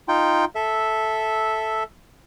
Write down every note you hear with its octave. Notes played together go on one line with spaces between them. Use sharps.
D#4 F4 G5
A4 E5